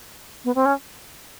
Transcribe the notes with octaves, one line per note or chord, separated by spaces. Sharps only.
B3
C4
C#4